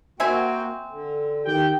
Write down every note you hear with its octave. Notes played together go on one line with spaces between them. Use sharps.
A#3 C4 F#4 E5 G5 G#5
D3
D#3 G4 G5